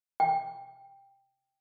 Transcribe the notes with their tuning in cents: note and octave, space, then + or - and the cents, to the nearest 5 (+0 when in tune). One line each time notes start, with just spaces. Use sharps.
G5 +10